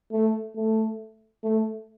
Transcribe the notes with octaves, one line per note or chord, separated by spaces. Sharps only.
A3
A3
A3